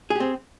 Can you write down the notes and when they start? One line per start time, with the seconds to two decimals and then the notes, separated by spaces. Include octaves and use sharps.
0.10 G#4
0.15 G4
0.20 C4